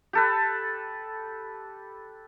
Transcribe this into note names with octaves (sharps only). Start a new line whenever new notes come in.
G4 A4 B4